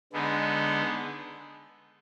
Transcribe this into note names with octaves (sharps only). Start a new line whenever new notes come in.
D3 G#3 B3 D#4